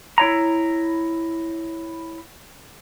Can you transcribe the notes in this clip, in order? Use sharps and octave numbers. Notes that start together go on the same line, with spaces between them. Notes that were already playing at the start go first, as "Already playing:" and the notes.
E4 C#5 A#5